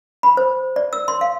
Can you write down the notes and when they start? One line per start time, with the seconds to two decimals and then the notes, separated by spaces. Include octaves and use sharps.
0.23 B5
0.37 C5
0.76 D5
0.93 E6
1.08 C6
1.21 F5